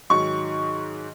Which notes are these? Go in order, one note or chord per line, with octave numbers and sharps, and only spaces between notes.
G#2 D#3 F#3 C#6